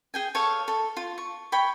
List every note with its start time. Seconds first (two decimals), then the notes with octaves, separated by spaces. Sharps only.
0.14 G#4 G5 G#5
0.35 A4 C#5 F5 C#6
0.68 A4
0.97 F4
1.18 C#6
1.52 C#5 G5 B5